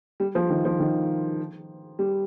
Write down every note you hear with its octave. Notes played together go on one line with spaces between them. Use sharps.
G3
F3
D#3
F3
D#3
G3